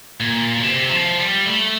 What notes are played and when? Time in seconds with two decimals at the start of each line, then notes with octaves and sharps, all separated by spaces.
0.20 A#2
0.57 B2
0.63 C3
0.90 F3
1.18 G3
1.46 A3